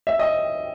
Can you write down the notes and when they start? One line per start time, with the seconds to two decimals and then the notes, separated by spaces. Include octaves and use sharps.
0.07 E5
0.19 D#5